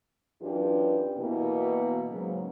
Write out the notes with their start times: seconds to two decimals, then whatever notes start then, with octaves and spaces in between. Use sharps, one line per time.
0.41 F#2 E3 D4 F4 G4
1.17 B2 E3 A#3
2.10 G#2 C#3 F#3